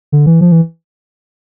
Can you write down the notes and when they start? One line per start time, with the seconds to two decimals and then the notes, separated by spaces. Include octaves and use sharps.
0.12 D3
0.26 E3
0.41 F3
0.52 E3